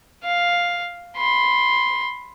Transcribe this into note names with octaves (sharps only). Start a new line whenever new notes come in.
F5
B5 C6